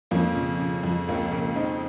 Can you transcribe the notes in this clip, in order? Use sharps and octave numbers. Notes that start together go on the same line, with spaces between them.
F2 A#3 C#4
C#3
C#3
F2
C#2 A#3 C#4
C#3 A#3 C#4
C#3 C4 D#4